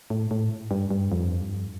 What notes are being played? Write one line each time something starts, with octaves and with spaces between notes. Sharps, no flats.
A2
A2
G2
G2
F2
G2